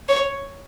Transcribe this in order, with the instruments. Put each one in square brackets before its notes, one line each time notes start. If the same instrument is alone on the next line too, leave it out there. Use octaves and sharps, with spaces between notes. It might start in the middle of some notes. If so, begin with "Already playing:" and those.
[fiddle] C#5